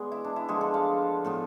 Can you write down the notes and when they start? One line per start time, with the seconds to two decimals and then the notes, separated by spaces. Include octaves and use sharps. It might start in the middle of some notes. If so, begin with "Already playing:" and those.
Already playing: G#3 B3 G#4 D5
0.12 E4
0.25 D4
0.36 E4
0.48 D3 F3 G#3 G#4
0.61 A4
0.74 F5
1.24 A2 F3 B3